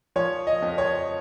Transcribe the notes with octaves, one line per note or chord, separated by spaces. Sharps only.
F3 C#5
D#5
F2
C#5